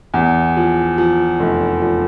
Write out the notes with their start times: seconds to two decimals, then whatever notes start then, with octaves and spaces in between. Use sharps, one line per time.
0.14 E2
0.57 F3
0.98 F3
1.40 F1
1.82 F3